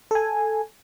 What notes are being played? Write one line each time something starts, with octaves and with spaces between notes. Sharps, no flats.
A4 G#5